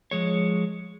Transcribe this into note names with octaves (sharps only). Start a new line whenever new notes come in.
F3 G#3 C#5